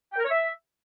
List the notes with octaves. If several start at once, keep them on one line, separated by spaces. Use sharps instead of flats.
G5
A#4
C#5
E5